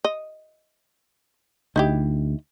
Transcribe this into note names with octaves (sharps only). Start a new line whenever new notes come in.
D#5
D2 D#4 E4 G4